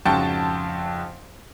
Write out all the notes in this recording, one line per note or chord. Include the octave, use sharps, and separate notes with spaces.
F2 G#2 C#3 F#4 G5 A5